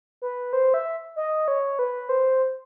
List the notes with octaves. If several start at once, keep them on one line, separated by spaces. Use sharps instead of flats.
B4
C5
E5
D#5
C#5
B4
C5